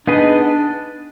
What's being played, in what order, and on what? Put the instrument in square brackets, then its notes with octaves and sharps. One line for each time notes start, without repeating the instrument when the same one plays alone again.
[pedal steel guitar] B3 D#4 G#4 B4 D#5 [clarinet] D4